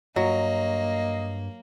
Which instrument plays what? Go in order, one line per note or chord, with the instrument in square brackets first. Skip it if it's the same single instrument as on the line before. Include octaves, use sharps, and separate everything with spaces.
[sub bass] G2 [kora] F#3 [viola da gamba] A#3 [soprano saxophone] D#5